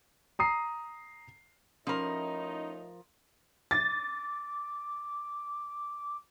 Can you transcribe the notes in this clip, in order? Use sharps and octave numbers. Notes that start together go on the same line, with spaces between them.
A#5 D#6 C7
A2 F3 C#4 D#4 A#4 C5 B5
D6 A6